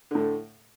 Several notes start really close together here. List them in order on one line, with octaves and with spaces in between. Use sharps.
D3 A2 A3